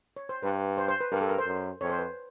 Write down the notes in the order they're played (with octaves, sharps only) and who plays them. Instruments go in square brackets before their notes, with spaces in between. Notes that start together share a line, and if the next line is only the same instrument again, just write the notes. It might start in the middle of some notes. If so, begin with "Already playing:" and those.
[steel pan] C#5
C5
[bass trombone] G2 [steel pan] B4
[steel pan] C5
C5
B4
[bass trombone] G2 [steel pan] A#4
[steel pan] A4
A#4
C5
[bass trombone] F#2
[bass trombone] F2 [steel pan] C#5
[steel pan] C5
B4